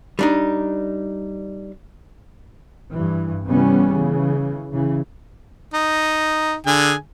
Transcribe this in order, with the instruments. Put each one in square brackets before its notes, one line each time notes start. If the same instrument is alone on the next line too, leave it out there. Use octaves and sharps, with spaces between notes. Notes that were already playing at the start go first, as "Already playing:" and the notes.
[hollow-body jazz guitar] G3 D4 D#4
[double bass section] G2 E3
C3 E3 G3 B3 C#4
C#3 E3
C#3 E3
[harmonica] D#4
D3 G#4 G#5